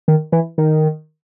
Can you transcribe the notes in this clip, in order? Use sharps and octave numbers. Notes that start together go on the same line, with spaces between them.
D#3
E3
D#3